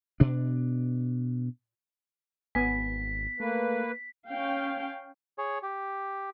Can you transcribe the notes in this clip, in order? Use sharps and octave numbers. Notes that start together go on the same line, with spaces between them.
B2 D4
G#1 B3 G#5 B6
A3 A#3 B4
C#4 F5 G5
G#4 C#5
G4